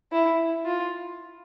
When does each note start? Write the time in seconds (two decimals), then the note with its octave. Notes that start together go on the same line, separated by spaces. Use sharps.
0.12 E4
0.65 F4